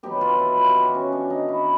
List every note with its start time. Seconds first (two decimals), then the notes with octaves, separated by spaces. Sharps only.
0.03 D#3 F#3 B3 G4
0.21 F4
0.39 E4
0.57 F4
0.68 G4
0.76 F#4
0.94 C#4
1.12 D4
1.30 D#4
1.49 E4